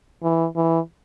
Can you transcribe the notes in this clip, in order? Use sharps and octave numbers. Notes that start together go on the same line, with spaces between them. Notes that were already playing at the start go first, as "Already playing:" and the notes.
E3
E3